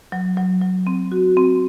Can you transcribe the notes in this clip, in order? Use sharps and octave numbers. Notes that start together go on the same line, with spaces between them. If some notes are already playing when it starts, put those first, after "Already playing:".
F#3
F#3
F#3
C4
F#4
C4